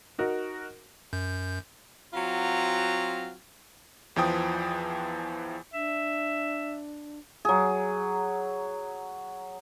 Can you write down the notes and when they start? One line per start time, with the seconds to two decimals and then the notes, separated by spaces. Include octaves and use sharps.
0.18 D#4 F#4 A#4
1.13 F#2 G6
2.14 F#3 C4 F4 F#4 A#5
4.16 E2 E3 F3 G5 D#6
5.72 D4 E5
7.45 F#3 G#4